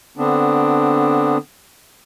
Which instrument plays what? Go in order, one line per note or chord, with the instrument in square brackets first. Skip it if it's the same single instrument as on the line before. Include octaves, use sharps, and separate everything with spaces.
[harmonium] D3 B3 C4 D4